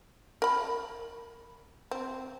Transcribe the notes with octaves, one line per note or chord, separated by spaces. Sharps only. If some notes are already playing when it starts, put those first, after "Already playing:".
A#4 B5
C4